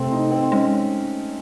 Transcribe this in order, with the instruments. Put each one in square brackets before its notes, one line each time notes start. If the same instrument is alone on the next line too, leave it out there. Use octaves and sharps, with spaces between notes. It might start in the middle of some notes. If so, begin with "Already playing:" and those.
Already playing: [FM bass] C3 [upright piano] A3 C4
[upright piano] D#4
C4
[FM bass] G#3 [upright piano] C#4